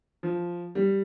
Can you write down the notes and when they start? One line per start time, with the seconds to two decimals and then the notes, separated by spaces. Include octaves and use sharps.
0.23 F3
0.75 G3